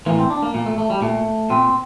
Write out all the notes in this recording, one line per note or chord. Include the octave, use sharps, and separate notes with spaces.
A2 E3 A#3
C4
D4
A#3
A#2 A#3
A3
A3
G3
A#2 A3
A#2 C4